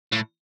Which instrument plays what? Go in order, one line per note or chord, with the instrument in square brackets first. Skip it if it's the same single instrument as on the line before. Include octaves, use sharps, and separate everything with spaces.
[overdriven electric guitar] A2